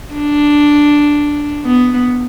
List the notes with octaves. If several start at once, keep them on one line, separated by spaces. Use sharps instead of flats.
D4
B3